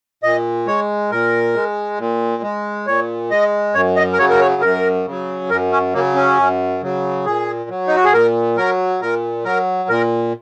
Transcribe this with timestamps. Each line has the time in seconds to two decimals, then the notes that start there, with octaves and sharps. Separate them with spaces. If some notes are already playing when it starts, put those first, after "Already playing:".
0.23 A#2 D#5
0.67 G#3 C#5
1.11 A#2 A#4
1.55 G#3
1.99 A#2
2.42 G#3
2.87 A#2 C#5
3.31 G#3 D#5
3.74 F#2 C#5
3.96 D#5
4.13 A#4
4.18 C#3 F#3 C#5
4.30 A#4
4.40 C#5
4.62 F#2 A#4
5.06 C#3 F#3
5.50 F#2 A#4
5.72 C#4
5.94 C#3 F#3 A#3
6.15 C#4
6.38 F#2
6.82 C#3 F#3
7.25 A#2 G#4
7.70 F#3
7.87 D#4
7.96 F#4
8.05 G#4
8.13 A#2 A#4
8.57 F#3 A#4
9.01 A#2 A#4
9.45 F#3 A#4
9.89 A#2 A#4